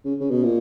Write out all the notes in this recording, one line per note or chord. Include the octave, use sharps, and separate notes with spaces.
C#3
C#3
B2
A#2